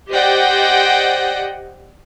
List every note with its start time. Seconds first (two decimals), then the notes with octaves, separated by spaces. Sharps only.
0.11 G4 C5 D5 D#5 F#5 G5